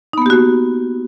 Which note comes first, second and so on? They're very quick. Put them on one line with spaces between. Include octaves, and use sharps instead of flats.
D#4 B3 A#3 G4 F#4